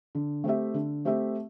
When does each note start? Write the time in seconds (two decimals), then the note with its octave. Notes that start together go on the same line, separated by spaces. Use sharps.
0.15 D3
0.44 A3 C4 G4 E5
0.74 D3
1.05 A3 C4 G4 E5